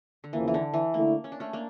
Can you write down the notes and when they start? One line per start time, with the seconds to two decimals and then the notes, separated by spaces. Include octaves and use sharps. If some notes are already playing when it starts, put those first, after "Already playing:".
0.24 D3
0.33 E2 C#3 E3 F3 A#3 E4
0.48 E3
0.54 D3
0.73 E3
0.94 D3 A3 A#3 E4
1.24 C#4
1.32 D4
1.40 A3 C#4
1.53 A#3 D4